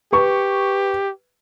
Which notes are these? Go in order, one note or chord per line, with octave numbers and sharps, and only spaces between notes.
G4 B4 C#6